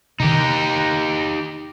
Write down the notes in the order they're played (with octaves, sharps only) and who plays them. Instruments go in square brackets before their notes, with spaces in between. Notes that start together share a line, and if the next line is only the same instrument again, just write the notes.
[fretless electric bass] C3 D#3 [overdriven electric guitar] D#4 G4